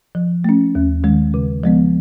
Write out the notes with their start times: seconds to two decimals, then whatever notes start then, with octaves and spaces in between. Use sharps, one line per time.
0.15 F3
0.44 A3 C#4
0.75 D#2
1.04 D#3 G#3
1.34 C#3
1.64 F3 G#3 B3